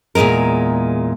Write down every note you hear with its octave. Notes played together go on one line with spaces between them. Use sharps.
E2 A#2 F3 G#3 A#4